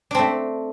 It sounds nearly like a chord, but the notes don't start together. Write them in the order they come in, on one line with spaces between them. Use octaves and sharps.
D4 C4 A3